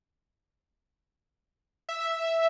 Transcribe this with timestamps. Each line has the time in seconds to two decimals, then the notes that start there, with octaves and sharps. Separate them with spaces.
1.89 E5